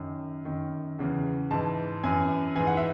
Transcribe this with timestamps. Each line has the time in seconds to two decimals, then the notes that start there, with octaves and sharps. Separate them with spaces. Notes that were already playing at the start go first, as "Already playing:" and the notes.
Already playing: F#2 D#3
0.45 F#2 D#3
0.99 E2 C#3 E3
1.51 G#2 E3 A5
2.03 F#2 E3 G#5
2.56 G#2 E3 G#5
2.67 F#5
2.77 E5